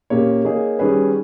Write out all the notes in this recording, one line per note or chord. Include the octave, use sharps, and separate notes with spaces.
A#2 A#3 C#4 G4 C#5
A#3 D#4 G#4 C#5
D#3 G3 C#4 G#4 B4